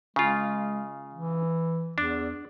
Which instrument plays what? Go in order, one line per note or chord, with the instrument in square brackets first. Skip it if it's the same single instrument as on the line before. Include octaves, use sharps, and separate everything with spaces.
[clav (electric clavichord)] C#3 F4 [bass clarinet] G#3
[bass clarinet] E3
[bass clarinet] E2 [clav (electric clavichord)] D4